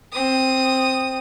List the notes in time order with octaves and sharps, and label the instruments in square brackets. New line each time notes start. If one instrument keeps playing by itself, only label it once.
[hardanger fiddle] C4 D#6